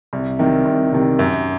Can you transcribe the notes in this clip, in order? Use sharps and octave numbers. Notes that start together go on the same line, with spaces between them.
C2
C3 D#3
C2
C3 D#3
F#2